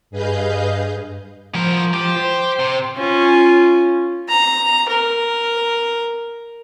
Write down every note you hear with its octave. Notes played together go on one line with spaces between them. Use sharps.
G2 G#4 B4 D#5 F5 G6
F3 B3 A#4
F3 G4
C5
C3
C#4 F4
A#5
A#4